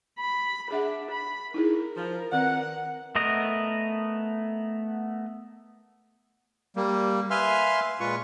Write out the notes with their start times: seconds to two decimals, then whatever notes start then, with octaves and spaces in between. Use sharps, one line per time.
0.20 B5
0.71 D4 G#4 E5 F#5
1.10 B5
1.54 D#4 E4 G#4 A#4
1.97 F3
2.32 D#3 C4 B4 F#5
3.15 A3 B3 A#4 D#5
6.76 G3 A#3
7.30 B4 E5 F5 G#5 C6 F6
8.00 A#2 G#3 F4 B4 C#6